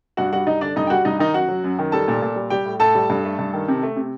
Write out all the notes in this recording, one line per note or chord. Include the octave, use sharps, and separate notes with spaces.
G2 F#4 F#5
G3 F#4 F#5
G2 D#4 D#5
D3 D4 D5
G2 D#4 D#5
G5
G3 F#4 F#5
G2 D#4 D#5
D#3 D#4 D#5
F#2 F#4 F#5
F#3
F#2
D#3
G3 A4 A5
A#2
A#2
G3
G3 G4 G5
A2
A2 A4 A5
G3
G2
A3
G2
D#3
C3
A3
C3